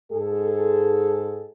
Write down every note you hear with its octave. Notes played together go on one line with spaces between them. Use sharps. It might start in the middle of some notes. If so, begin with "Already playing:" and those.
G#2 G#3 G#4 A4